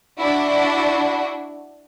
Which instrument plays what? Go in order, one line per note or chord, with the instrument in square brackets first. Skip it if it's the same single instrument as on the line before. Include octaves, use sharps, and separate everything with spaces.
[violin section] D4 E4 F#4